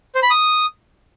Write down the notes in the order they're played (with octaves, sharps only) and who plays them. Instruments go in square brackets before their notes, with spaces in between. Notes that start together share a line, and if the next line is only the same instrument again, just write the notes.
[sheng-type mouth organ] C5
B5
D#6